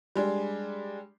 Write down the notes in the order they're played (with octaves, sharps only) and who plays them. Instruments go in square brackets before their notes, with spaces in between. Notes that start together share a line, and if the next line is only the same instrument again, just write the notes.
[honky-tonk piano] G3 G#3 D4